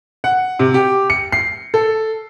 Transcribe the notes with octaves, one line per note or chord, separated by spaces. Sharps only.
F#5
C3
G4
C#7
C7
A4